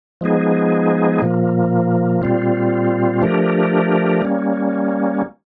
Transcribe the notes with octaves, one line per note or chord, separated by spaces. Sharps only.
F3 G#3 B3 D#4 G#4
A#2 F3 A#3
A#2 G3 C4 F4
F3 A3 D4 G4 A#4
G3 A#3 C#4